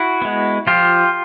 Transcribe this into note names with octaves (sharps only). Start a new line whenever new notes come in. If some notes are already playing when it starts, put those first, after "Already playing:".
Already playing: E4 F#4
G#3 B3
F3 F4 G4